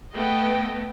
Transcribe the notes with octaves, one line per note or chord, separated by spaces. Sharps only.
A3 B3 D#5 G5